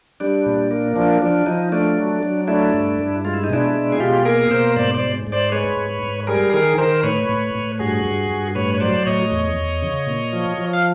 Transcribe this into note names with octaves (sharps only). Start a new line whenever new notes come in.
G3 D4
A#2
A#3
F3 D4
F3 D4
F3 D#4
A3 D4
F#3
F#3
A3 D4 E4
G2
G2
G#3 F4
E4
D#4
B2 D4 E4
G#3
G#4
B2 F4 G4
A#3 G#4 A#4
B2 A#4 C5
G#2 C5 D5
C5 D5
G#2
G#2
C5 D5
G#3 B4 C#5
G#2
G#2
G3 G#4 A#4
D#3 G#4 A#4
D#3 A#4 C5
A2 B4 C#5
A2
A2
G2 F#4 G#4
G2
G2
A2 B4 C#5
C#5
F#3 C5 D5
A2 C#5 D#5
E2
E2
C#3
A#2
F3
F3
F5